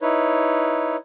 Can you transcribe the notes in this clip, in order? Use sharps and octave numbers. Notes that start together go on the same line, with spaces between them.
D#4 E4 B4 C#5